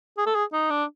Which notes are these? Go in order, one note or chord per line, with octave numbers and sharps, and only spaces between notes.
G#4
A4
G#4
D#4
D4